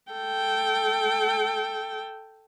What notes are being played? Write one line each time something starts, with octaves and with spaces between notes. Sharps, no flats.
A4 G5